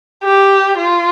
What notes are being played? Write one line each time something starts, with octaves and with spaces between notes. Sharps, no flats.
G4
F4